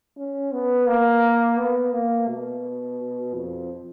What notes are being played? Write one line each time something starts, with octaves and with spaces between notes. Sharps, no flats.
C#4
B3
A#3
B3
A#3
B2
F2